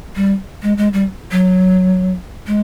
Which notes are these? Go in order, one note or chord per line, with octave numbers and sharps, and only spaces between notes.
G3
G#3
G#3
G3
F#3
G#3